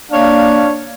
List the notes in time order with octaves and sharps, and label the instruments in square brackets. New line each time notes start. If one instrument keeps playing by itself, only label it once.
[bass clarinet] A#3 [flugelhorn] D4 [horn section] C#5 F5